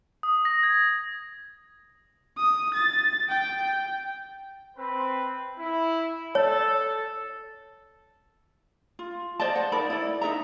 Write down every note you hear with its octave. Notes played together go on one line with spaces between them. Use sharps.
D#6
A#6
G#6
D#6
A6
G5
C4 B4
E4
A4 C#5 A5
F4
C5 D5 D#5 A5
F#5
D#4 A#4 D5 B5
E4 D5
D#4 A#4 E5 A#5